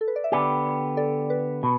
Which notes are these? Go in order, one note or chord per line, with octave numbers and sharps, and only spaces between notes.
A4
B4
D5
E5
D3 B3 G4 D5 G5
A4 D5
B4
B2